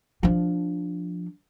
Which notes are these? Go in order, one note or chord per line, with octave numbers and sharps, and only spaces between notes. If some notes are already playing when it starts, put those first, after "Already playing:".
F3 D4